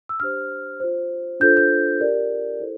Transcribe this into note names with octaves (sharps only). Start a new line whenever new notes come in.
E6
D4 G4 C5 F6
F4 C5
D4 F4 A4 C5 G6
G6
G4 A#4 D5
E4 A4 C5